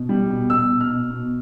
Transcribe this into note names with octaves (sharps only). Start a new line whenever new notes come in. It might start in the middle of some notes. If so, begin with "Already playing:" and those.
Already playing: B2
G3
B2
B2 E6
B2
F6
B2
B2